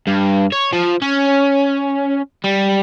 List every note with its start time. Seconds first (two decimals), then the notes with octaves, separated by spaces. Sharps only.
0.07 G2
0.52 C#5
0.73 F3
1.02 C#4
2.44 G3